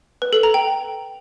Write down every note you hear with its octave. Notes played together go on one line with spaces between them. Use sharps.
B4
A4
A#5
G5